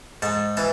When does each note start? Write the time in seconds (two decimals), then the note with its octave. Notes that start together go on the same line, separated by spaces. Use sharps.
0.22 G#2 A5
0.57 E3 A5